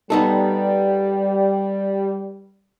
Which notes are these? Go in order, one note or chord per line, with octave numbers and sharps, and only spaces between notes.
G3 B3 D#4 A4